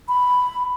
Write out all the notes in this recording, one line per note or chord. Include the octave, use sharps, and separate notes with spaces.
B5